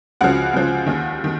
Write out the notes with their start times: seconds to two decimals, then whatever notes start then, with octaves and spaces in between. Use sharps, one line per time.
0.21 C#2 C#3 F3 F#4 F#5
0.53 C#2 C#3 F3
0.86 D#2 D#3
1.24 D#3